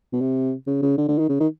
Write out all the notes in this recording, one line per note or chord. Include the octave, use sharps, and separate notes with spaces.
B2
C3
C#3
C#3
D3
D3
D#3
C#3
D#3